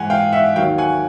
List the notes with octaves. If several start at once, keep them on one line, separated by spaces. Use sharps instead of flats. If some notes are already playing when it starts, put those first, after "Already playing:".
Already playing: G#2 E3 F#5 G#5
F5 G5
E5 F#5
D#2 D#3 F#3 F5 G5
F#5 G#5